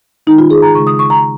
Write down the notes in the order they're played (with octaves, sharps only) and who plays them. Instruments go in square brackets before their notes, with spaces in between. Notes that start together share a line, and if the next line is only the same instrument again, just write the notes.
[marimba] D#3 G#3 D#4
F4
G#4
A#5
C#3 C#6
G#3
D#6
C#6
A#5